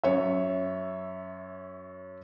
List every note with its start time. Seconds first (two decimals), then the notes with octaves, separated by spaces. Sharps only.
0.04 F#2 C#5 E5